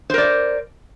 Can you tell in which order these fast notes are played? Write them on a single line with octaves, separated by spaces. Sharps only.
C5 A#4 D5